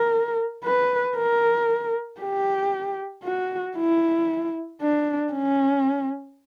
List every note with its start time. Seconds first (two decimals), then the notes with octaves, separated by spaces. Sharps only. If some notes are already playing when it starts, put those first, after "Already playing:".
Already playing: A#4
0.64 B4
1.16 A#4
2.21 G4
3.24 F#4
3.76 E4
4.81 D4
5.33 C#4